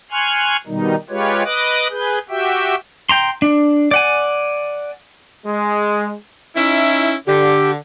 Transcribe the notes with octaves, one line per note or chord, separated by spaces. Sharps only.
G#5 C6 C#6 F6 F#6
B2 D#3 G3 D#4
G#3 F4 G4 B4 C#5
B4 D#5 D6 D#6 F#6
G#4 B4 G6
F#4 G4 E5 G5
G5 A#5 C6
D4
D5 F#5 G#5
G#3
C#4 D#4 E4
D3 G4